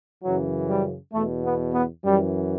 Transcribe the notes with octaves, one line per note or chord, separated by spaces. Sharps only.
F#2 C#3 E3 F#3
G3
E2 B2 A3
B3
B3
F#2 E3 G3